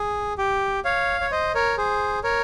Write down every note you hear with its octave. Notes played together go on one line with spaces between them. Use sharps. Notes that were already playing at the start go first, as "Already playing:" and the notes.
Already playing: G#4
G4
C#5 F5
C#5
C5 D#5
A#4 C#5
G#4 C5
A#4 C#5